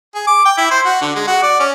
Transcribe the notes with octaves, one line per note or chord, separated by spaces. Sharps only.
G#4
D6
G5
E4
C5
F#4
D3
G#3
F#4
D5
C#4